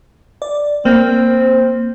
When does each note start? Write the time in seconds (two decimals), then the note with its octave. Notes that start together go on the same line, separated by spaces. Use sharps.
0.42 D5
0.85 A#3 C4